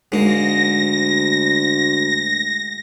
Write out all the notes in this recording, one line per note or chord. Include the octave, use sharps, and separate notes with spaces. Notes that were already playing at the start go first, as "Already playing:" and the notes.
D2 G#2 A#3 A#6